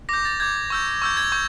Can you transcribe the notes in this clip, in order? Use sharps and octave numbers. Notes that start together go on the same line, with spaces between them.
D6 G6 A#6
A6
D6 G6 G#6
C#6 E6 G6
C#6 E6 G6
G#6
C#6 G6